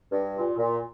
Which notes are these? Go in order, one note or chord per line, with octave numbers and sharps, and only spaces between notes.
G2
A#2
A#2